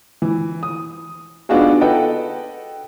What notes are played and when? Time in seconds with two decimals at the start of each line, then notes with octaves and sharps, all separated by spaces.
0.22 E3
0.63 D#6
1.49 B3 D4 D#4 F4 F#4 G#4
1.81 A4 B4 D#5 F#5 G5